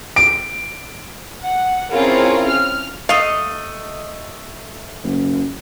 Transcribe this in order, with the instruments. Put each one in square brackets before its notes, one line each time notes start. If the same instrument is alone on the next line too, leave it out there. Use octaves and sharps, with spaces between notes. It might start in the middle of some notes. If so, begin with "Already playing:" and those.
[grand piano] D7
[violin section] F#5
C4 C#4 E4 F4 G#4 A#4
F6
[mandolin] A3 D#5 [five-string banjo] F5
[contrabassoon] F#1